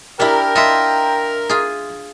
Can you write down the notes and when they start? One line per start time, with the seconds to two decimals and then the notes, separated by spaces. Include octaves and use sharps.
0.20 D4 E4 G4 A#4 G5
0.56 F4 D#5 E5 C6
1.49 F4 G#4